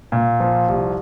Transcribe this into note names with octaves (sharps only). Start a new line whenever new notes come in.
A#2
F3
C2